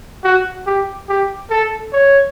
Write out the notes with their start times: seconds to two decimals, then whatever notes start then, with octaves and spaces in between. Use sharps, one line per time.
0.24 F#4
0.66 G4
1.09 G4
1.50 A4
1.93 C#5